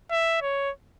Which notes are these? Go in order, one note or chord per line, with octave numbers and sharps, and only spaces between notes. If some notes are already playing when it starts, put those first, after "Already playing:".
E5
C#5